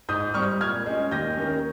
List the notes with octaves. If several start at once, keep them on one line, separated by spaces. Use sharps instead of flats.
G#2 D#6 G6
G3 C4 C#6 F6
A#2 F6 G#6
G#3 C#4
D#2 G6 A#6
D#3 A#3 C#4